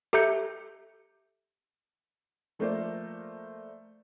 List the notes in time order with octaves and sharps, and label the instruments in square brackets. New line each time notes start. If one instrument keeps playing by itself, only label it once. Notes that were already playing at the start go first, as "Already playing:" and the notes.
[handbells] G4 A4 E5 A#5 G6 C#7
[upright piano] F3 A3 A#3 A#4 C5 D5